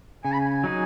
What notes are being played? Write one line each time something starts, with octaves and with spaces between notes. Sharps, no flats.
C#3 G#5
B5
G#5
F#3 D#4 G#4